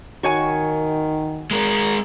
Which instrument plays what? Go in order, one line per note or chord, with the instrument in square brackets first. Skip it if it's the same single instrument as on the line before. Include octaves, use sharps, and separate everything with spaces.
[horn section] D#3 [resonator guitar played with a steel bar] F#4 C#5 G#5
[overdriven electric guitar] G#3 A#4